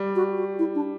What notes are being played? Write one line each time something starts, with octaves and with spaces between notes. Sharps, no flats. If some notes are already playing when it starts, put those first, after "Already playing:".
Already playing: G3
F#4
F#4
E4
D4